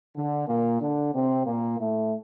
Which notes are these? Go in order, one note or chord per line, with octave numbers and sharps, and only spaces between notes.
D3
A#2 A#3
D3 D4
C3 C4
A#2 A#3
A2 A3